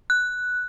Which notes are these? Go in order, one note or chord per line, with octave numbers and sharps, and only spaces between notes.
F#6